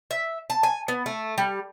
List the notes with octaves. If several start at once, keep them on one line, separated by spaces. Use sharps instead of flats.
E5
A5
G#5
B3
A3
G3